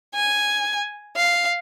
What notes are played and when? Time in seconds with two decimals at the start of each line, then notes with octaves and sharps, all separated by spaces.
0.14 G#5
1.16 F5